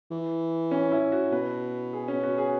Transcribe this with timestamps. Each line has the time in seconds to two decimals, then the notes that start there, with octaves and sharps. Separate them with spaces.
0.11 E3
0.71 C#4
0.92 E4
1.12 F#4
1.32 B2 B4
1.93 G#4
2.08 C#4
2.23 F#4
2.38 G#4